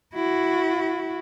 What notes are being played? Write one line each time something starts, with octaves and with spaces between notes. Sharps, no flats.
E4 F#4